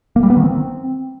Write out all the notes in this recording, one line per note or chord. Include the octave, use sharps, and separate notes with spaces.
A#3
G3
B3
D#3
C4